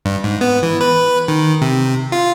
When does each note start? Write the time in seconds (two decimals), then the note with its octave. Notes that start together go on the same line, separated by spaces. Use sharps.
0.05 G2
0.24 G#2
0.41 B3
0.63 E3
0.81 B4
1.28 D#3
1.62 C3
2.12 F4